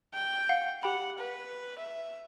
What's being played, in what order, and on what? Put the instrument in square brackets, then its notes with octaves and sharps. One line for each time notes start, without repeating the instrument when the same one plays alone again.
[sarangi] G5
[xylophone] F5 F#5
[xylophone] G4 G5 B5 [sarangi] F#5
[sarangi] B4
E5